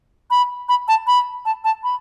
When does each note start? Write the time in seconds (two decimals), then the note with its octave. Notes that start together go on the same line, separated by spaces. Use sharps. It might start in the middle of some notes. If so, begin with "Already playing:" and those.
0.31 B5
0.69 B5
0.88 A5
1.07 B5
1.45 A5
1.64 A5
1.84 B5